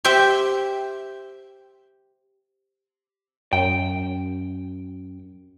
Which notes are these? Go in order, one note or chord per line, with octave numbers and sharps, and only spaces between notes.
G4 C5 E5 G5
F#2 G5